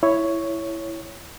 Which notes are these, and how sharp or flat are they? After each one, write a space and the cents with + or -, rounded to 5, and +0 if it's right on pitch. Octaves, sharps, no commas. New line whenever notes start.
E4 +5 C#5 +5